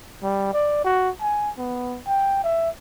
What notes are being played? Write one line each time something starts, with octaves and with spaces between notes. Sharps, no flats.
G3
D5
F#4
G#5
B3
G5
E5